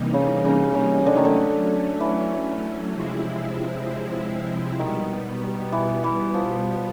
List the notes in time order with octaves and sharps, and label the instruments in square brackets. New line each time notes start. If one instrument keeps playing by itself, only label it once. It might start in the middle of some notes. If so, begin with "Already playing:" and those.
Already playing: [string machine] C3 E3 G3 A#3 D#4
[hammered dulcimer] C#3
C#3
C#3
[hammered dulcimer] D3 [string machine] F#3 A3 C#4
[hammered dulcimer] D#3
D3
E3
[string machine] C3 F3 G#3 C4 E4
[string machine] B2 G3 B3 [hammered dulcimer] D#3
[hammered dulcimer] E3
E3
F3